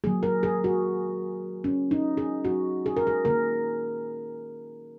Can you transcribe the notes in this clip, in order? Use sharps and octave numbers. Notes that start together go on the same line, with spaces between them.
D#3 F#3 A#3 G#4
A#4
G#4
F#4
C#4
D#4
G#4
F#4
G#4
A#4
G#4
D#3 A#3 A#4